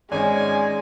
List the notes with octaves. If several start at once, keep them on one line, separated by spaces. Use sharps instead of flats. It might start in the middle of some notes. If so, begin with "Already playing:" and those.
G#1 G#3 C#4 D5 G#5